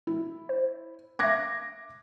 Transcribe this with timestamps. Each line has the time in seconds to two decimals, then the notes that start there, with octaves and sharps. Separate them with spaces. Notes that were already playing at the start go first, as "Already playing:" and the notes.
0.07 E4
0.49 C5
1.19 E5 F5 D6 F#6 G#6 A#6